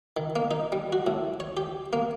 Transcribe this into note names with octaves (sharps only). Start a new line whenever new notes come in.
D#3
A#3
D#4
G3
F#4
A2
C#5
G4
A#3